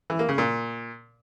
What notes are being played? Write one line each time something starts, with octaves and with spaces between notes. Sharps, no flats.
E3
A#3
C#3
A#2